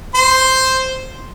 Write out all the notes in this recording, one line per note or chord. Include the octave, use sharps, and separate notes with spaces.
C5 C6